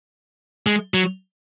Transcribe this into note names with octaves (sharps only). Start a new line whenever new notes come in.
G#3
F#3